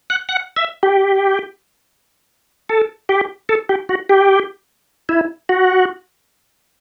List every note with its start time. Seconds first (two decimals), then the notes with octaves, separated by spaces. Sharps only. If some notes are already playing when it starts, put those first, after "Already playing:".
0.10 F#5
0.29 F#5
0.57 E5
0.83 G4
2.69 A4
3.09 G4
3.49 A4
3.69 G4
3.89 F#4
4.09 G4
5.09 E4
5.49 F#4